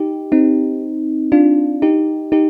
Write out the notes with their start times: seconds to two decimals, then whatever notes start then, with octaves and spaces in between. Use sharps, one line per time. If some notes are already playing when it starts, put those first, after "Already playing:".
Already playing: D#4 G4
0.32 C4 D#4
1.32 D4 F4
1.82 D#4 G4
2.32 D#4 G4